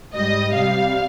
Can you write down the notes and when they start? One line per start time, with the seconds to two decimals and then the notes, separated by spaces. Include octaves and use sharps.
0.13 G#2 G3 D#5
0.54 C3 G3 F5